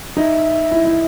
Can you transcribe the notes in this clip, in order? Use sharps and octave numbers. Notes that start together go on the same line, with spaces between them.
D#4 E5
E4
E4